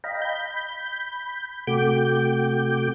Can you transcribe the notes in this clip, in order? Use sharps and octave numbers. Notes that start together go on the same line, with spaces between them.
D#5 F5 G5 A#5 B5
B5 G6
C3 A3 F#4 G5 D6 G6